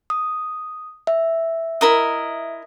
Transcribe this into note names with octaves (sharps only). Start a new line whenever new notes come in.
D#6
E5
E4 A#4 D#5